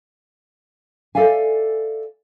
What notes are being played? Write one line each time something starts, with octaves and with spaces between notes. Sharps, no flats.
A4 D5 E5 F5 G#5